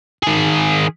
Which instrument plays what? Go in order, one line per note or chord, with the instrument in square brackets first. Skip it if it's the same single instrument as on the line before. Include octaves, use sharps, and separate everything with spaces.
[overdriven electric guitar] D#3 G#4